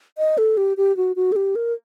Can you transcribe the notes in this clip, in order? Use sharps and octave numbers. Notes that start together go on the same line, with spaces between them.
D#5
A4
G4
G4
F#4
F#4
A4
G4
A#4